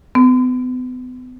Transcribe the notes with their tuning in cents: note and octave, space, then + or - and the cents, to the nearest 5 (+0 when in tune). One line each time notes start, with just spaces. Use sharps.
B3 +35